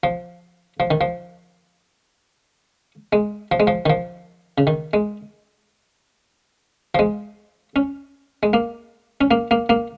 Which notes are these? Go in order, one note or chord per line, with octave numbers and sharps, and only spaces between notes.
F3
F3
D#3
F3
G#3
F3
G#3
F3
D#3
F3
C#3
D#3
G#3
F3
G#3
C#4
G#3
A#3
C#4
A#3
A#3
A#3